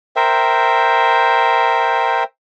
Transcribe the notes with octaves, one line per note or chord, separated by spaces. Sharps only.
A#4 C5 E5 G5